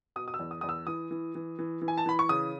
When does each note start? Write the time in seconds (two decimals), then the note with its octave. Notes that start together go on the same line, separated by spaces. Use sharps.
0.16 B2 D#6
0.28 D#6
0.34 E6
0.39 E2
0.51 D#6
0.61 E2 D#6
0.69 E6
0.87 E3 D#6
1.11 E3
1.35 E3
1.59 E3
1.82 E3
1.88 G#5
1.98 A5
2.06 E3 B5
2.19 C#6
2.29 C#3 D#6